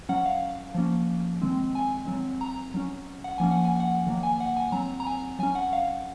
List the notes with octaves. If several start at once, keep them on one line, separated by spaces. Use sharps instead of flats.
F#3 C#4 F#5
F5
F3 A#3 C#4
D#3 G#3 C4
G#5
F#3 C4
A#5
F#3 C#4
F#5
F3 A#3 C#4 G#5
F#5
G#5
F#5
D#3 F#3 A#3
G#5
F#5
G#5
F#3 C4 A#5
A#5
G#5
F#3 C#4 G#5
F#5
F5